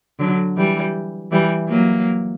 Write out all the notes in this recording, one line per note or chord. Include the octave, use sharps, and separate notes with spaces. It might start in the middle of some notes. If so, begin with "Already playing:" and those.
D3 F#3
E3 G3
E3 G3
F#3 A#3